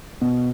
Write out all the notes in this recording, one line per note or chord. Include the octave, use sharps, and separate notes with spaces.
B2